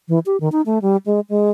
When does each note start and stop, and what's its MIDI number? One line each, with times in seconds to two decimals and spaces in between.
0.08 0.19 52
0.26 0.37 67
0.40 0.49 51
0.52 0.62 63
0.66 0.79 57
0.82 0.97 55
1.06 1.20 56
1.29 1.51 56